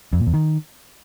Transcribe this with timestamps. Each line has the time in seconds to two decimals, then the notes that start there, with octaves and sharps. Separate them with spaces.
0.13 F2
0.20 A#2
0.27 E2
0.34 D#3